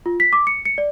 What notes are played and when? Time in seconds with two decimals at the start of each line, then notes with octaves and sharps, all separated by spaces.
0.06 F4
0.20 B6
0.33 D6
0.47 C#7
0.66 C#7
0.78 D5